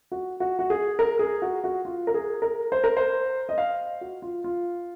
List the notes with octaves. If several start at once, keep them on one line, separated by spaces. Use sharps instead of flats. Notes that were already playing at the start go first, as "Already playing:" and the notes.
F#4
F#4
F#4
G#4
A#4
G#4
F#4
F#4
F4
A#4
G#4
A#4
C5
A#4
C5
D#5
F5
F#4
F4
F4